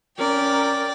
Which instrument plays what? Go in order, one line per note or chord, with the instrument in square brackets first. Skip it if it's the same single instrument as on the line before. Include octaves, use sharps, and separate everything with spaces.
[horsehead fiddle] C#4 A#4 [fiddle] D5 G5